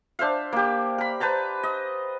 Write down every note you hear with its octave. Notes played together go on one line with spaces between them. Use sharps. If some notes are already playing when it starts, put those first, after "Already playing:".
D4 C5 E5 F5
A#3 G4
A#4 B5
B4 C5 A5 A#5
D#5